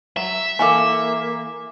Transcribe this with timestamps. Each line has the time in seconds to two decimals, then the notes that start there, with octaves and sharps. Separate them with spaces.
0.16 F#3 E5
0.59 E3 A#3 A4 F5 G#5 D6